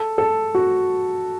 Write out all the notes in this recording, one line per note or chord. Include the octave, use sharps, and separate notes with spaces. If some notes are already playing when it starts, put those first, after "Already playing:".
Already playing: A4
A4
F#4